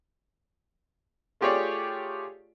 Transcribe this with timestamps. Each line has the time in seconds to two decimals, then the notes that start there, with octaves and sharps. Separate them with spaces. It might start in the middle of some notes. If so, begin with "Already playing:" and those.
1.41 A3 F4 G4 G#4 C#5 D5